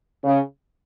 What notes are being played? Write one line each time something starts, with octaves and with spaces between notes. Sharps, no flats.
C#3